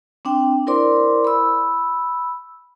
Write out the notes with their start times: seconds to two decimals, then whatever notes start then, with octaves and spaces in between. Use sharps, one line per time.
0.25 C4 D4 G5
0.67 E4 A#4 C5 D5 C6 D6
1.25 B5 E6